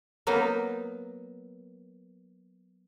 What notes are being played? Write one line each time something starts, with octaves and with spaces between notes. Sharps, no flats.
F#3 A#3 B3 D#4